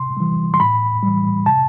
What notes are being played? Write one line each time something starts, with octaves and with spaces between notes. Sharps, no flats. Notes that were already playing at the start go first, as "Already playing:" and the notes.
Already playing: C3 C6
E3 G3
C6
A2 B5
G3
E3
C3 A5